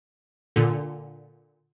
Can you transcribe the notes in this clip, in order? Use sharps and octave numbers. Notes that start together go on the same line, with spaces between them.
A#2 D3